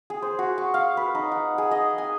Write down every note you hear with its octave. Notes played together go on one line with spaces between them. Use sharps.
G#4
C5
F#4
C#6
F5
B4
D#4
F#5
G#4
D#5
G#5